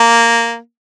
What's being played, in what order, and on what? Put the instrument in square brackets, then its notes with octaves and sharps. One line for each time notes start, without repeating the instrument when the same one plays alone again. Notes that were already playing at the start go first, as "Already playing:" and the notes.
Already playing: [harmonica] A#3